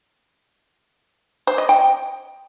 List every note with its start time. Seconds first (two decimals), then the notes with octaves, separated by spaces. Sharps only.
1.47 C5
1.58 D#5
1.69 G5